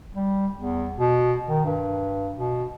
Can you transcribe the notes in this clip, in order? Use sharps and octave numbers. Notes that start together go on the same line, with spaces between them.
G3
E2
B2
D#3
G2
B2